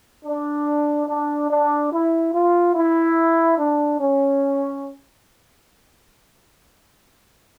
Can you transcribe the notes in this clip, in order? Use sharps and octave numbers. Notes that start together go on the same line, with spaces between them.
D4
D4
D4
E4
F4
E4
D4
C#4